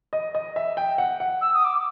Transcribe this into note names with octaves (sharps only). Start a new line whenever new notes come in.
D#5
D#5
E5
G5
F#5
F#5
E6
D#6
D6